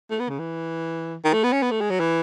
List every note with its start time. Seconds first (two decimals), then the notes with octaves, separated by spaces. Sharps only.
0.10 A3
0.19 B3
0.29 C#3
0.39 E3
1.24 D#3
1.33 A3
1.44 B3
1.52 C#4
1.62 B3
1.71 A3
1.81 G#3
1.90 F#3
2.00 E3